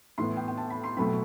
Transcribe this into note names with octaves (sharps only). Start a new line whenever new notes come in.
A2 E3 B3 C6
G5
G5
A5
B5
C6
B2 F#3 A3 C4 B5